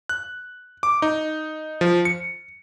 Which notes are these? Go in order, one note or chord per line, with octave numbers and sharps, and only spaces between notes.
F#6
D6
D#4
F3
C#7